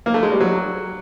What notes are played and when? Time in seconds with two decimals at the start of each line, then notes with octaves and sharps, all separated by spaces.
0.06 A#3
0.14 A3
0.23 G#3
0.32 G3
0.40 F#3